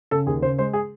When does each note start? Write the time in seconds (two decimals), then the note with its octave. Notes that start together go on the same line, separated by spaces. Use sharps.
0.11 C#3 A4
0.26 D#2 G#4
0.42 C#3 C5
0.58 G#3 C5
0.73 G#4